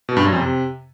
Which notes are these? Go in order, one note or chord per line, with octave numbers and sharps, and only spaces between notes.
B2
G2
F#2
F2
C3